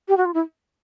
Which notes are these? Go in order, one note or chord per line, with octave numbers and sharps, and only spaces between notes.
G4
F#4
F4
E4